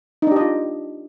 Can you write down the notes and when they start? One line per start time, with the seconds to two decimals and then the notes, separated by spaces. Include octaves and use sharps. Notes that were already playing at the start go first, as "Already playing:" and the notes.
0.22 D#4
0.27 D4
0.32 G4
0.36 D#5
0.41 F4